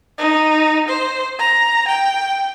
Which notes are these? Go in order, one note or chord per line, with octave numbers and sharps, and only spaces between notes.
D#4
C5
A#5
G5